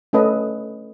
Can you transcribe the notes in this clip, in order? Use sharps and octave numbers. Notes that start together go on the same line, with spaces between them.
A3 C#4 A4 B4 D#5